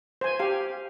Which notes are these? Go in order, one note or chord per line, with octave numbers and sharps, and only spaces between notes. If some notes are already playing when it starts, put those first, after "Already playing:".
C5 G#5
G4 F5